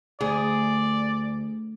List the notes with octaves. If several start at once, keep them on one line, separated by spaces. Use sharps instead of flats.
D2 G#4 D5